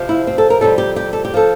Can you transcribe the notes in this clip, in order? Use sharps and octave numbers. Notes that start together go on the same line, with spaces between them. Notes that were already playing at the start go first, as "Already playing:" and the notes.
Already playing: F2 C3 F3
E4
C4
A4
A#4
F2 C3 G3 A4
G4
G4
A4
G4
F3 A4